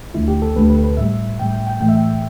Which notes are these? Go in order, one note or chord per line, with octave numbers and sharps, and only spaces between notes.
D2 D3 A3 E4
G4
A4
D2 D3 A3 B4
B4
B4
A2 G3 E5
A2 G3 G5
G5
A2 E3 A3 G5
E5
G5